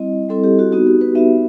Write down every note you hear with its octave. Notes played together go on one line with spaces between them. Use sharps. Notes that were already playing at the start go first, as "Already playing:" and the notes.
Already playing: G3 C4 E4 D#5
G3 C4 E4 A4
G4
F#4
B3 D#4 F#4
G4
B4
B3 D#4 F#4 E5